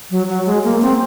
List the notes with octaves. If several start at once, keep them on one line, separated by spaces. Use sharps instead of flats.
F#3
F#3
G#3
A#3
C4